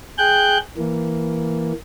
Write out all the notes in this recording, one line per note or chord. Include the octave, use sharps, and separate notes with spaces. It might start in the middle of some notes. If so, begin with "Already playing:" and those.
G#4 G5 F#6 G6
E3 A#3